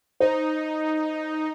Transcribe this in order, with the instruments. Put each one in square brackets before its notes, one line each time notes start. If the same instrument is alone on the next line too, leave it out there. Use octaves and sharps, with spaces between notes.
[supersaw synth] D#4 [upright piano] C5